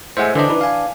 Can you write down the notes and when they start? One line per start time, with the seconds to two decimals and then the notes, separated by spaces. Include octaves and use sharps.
0.17 A2 G#3 C5 E5 F#5 G#5
0.35 D3 E3 D4 C5 D#5
0.49 D#4 E4 B4
0.61 F5 G#5